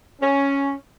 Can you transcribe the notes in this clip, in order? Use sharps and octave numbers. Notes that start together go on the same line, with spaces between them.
C#4